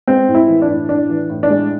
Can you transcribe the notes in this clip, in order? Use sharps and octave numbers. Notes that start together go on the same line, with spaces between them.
G#3 C4
A2
E4
E3
D4
A2
A2 D4
E3
A2
D4
G#3